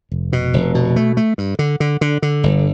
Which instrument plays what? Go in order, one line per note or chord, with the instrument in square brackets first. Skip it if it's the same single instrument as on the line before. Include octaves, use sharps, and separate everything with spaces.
[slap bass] F1
B2
F1
B2
A3
A3
G2
D3
D3
D3
D3
G1